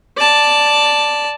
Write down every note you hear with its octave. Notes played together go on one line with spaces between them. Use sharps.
D5 A5